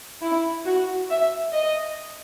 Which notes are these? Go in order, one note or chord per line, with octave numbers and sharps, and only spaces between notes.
E4
F#4
E5
D#5